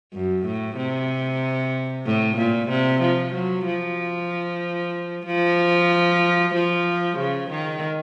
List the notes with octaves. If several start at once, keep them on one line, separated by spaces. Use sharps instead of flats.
F#2
A2
C3
A2
A#2
C3
F3
F#3
F3
F3
F3
C#3
D#3